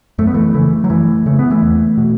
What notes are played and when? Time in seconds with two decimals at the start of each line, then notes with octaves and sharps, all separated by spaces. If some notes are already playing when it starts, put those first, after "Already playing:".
0.18 F#2 A3
0.27 B3
0.34 E3 A3
0.54 C#3 E3 A3
0.84 F#3
0.90 F#2 E3 A3
1.26 C#3 A3
1.39 B3
1.50 E3 A3
1.62 E2
1.98 B2